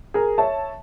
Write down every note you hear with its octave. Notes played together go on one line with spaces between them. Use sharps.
G#4 A#4
C#5 E5 A5